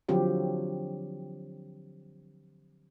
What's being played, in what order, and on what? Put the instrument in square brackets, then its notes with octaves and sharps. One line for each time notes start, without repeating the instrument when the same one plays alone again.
[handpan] D3 F3 F#3 C4 G4